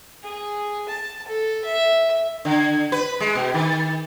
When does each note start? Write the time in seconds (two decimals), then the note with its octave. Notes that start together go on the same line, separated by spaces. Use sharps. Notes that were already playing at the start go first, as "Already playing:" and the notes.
0.23 G#4
0.89 A5
1.28 A4
1.65 E5
2.45 D3
2.92 B4
3.20 G#3
3.35 B2
3.54 D#3